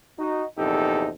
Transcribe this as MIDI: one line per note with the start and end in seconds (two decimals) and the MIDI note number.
0.19 0.45 63
0.19 0.45 66
0.58 1.10 34
0.58 1.10 40
0.58 1.10 48
0.58 1.10 63
0.58 1.10 67
0.58 1.10 69